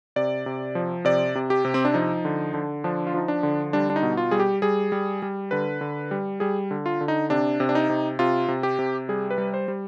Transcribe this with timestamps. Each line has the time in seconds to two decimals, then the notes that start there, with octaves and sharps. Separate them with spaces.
0.16 C3 D5
0.46 C3
0.75 F3
1.05 C3 D5
1.35 C3
1.50 G4
1.65 C3
1.74 C4
1.85 D4
1.94 F3 D#4
2.25 D3
2.54 D3
2.84 F3 D4
3.07 F4
3.14 F3 D#4
3.28 D4
3.43 D3
3.73 G3 D4
3.90 D4
3.96 D#4
4.02 B2
4.17 F4
4.31 G3 G#4
4.39 G4
4.62 G3 G#4
4.92 G3
5.22 G3
5.51 D3 B4
5.81 D3
6.11 G3
6.40 G3 G#4
6.71 D3
6.86 F4
7.01 D3
7.08 D#4
7.30 C3 D4
7.60 C3
7.69 D4
7.75 D#4
7.90 C3
8.19 C3 F4
8.48 C3
8.63 G4
8.79 C3
9.09 G3 G#4
9.31 B4
9.38 G3
9.54 C5
9.68 G3